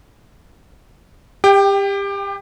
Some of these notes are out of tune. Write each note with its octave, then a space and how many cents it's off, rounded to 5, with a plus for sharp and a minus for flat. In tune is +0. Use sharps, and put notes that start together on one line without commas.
G4 +25 G5 +0